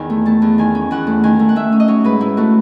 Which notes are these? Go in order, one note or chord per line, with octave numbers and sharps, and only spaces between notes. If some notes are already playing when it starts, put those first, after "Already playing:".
Already playing: E2 D#3 G#5
A3
A3 A5
E2
D#3 G#5
C#4
E2 F#5
A3
D#3 G#5
A3
F#5
A3 E5
C#4
D#5
F#3 C#5
G#2 B4
G#2 E4
A3 F#4